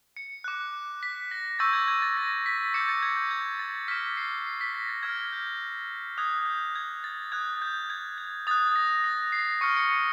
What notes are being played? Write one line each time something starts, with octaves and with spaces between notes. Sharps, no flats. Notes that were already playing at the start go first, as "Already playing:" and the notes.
C#7
D6 F#6
B6
A#6
C#6 E6 G6 A6
G#6
G#6
A6
A#6
B6
D6 G6 C#7
A6
G#6
G6
G#6
A6
D6 F6 B6
C7
C7
B6
A#6
A6
D6 F6 G#6
G6
D#6 F#6 G#6
G6
G#6
A6
D#6 F#6 G#6
G6
G#6
G#6
D#6 F#6 A6
A#6
A#6
C7
C#6 F6 C#7
C#7